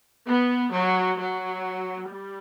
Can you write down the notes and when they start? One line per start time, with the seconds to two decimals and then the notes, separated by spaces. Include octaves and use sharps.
0.28 B3
0.73 F#3
1.18 F#3
2.09 G3